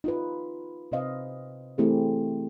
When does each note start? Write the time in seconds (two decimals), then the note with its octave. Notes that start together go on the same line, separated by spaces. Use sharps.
0.04 D#4 F4 B4
0.92 C3 C4 B4 C5 D#5 F5
1.78 E3 A3 C4 E4 G4 G#4